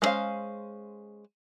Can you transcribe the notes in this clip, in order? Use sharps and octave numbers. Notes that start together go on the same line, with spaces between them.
G#3 B3 C#4 C5 F5